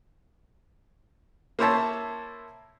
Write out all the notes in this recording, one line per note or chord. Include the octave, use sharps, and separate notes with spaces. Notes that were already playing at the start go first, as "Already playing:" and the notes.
A#3 E4 C5 C#5 E5 A5